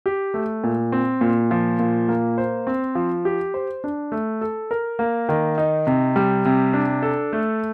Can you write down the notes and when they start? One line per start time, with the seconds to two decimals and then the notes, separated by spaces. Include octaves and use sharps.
0.06 G4
0.34 A3
0.64 A#2
0.92 C4
1.21 A#2
1.51 F3
1.79 A#2
2.08 A#3
2.38 C5
2.67 C4
2.95 F3
3.25 G4
3.54 C5
3.84 D4
4.12 A3
4.41 A4
4.71 A#4
4.99 A#3
5.29 D#3
5.58 D#4
5.87 C3
6.16 G3
6.45 C3
6.73 D4
7.02 A4
7.33 A3